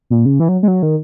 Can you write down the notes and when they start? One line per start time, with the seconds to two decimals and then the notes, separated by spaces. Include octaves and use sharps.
0.10 A#2
0.26 C#3
0.40 E3
0.49 F#3
0.63 G#3
0.68 F#3
0.83 D#3